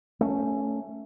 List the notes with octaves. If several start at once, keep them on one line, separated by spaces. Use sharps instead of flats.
A3 C#4